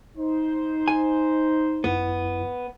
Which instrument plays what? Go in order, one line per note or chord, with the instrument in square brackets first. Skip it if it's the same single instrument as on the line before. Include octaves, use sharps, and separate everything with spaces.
[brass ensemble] D#4 C5
[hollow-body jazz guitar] G#5
[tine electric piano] G#1 F#2 E4 [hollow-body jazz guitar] B3